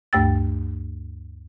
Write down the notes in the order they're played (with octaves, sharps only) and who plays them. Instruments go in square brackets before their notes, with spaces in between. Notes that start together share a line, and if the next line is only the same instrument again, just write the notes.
[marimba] D2 G2 A3 G5 E6 A6